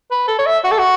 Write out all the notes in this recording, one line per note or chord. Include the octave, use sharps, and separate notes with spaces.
B4
A4
C#5
E5
F#4
A4
F#4